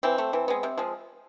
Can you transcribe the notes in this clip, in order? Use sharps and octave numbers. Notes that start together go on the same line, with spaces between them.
E3 C4
A3
E3
G#3 B3
C3
F3 G#3